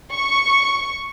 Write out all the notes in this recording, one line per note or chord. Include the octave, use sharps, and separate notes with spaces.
C#6